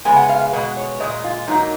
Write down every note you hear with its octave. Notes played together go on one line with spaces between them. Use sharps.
C#3 G#3 B3 G#5
F#5
F5
F5
B2 G#3 B3
C#5
A#2 G#3 D#5
F4
G#2 F#3 A#3 D#4